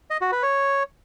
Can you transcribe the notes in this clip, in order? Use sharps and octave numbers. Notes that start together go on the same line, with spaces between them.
D#5
F#4
B4
C#5